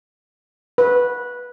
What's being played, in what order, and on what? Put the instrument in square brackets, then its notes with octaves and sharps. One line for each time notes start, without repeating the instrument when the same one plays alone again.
[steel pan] B4